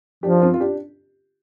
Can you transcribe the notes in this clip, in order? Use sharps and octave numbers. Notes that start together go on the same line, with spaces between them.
F3 D4 G4
C4 F4
F4
D4 G4